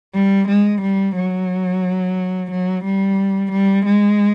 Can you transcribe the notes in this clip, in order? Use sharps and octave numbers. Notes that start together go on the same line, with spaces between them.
G3
G#3
G3
F#3
F#3
G3
G3
G#3